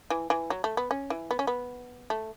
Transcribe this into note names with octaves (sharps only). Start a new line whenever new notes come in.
E3
E3
F#3
A3
B3
C#4
E3
B3
C#4
B3
A3